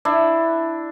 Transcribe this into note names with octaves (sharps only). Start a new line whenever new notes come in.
D4 E4